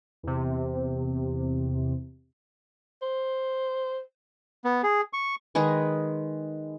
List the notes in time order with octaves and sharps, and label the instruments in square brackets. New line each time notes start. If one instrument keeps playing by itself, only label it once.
[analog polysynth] E2 C3
[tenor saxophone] C5
[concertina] B3
G#4
C#6
[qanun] D#3 G#3 G#4 B4